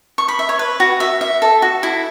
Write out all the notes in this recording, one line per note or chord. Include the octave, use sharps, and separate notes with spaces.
C#6
B5
E5
C#5
B4
F#4
E5
E5
A4
F#4
E4